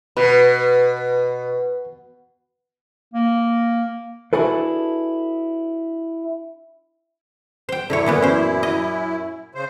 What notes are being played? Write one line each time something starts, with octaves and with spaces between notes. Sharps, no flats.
B2 B4
A#3
D4 E4 F#4 G#4 A4 B4
C5 G5
F#2 D3 F#3 E4 C#5
A#2 E3 B3
C#4 C5
D#5
C#3 C5